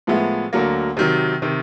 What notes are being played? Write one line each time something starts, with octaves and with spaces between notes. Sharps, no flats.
A2 F3 G#3 B3 E4
D2 D3 F#3 A#3
C3 D#3 F#3
C3 D#3